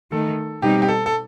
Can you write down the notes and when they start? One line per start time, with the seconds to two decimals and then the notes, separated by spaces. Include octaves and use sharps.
0.11 D#3 A3 D#4 A4
0.62 B2 G3 C4 D#4 G4
0.82 G4
0.88 A4
1.06 A4